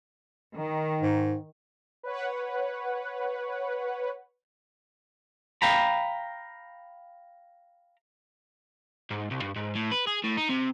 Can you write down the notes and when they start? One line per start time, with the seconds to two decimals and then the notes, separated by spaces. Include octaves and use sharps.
0.57 D#3
1.01 G#2
2.03 B4 C#5 F#5
5.62 F5 G5 A#5 B5
9.11 G#2
9.31 C2
9.42 G2
9.56 G#2
9.75 A2
9.92 B4
10.07 G#4
10.24 A2
10.37 D#4
10.49 C3